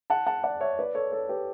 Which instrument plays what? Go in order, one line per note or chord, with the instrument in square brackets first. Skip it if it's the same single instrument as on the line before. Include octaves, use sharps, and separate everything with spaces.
[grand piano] F#5 A5
F#5 A5
D5 F#5
C#5 E5
B4 D5
A4 C#5
A4 C#5
G4 B4